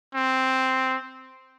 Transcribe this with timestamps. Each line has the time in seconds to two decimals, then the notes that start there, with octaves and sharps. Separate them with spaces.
0.15 C4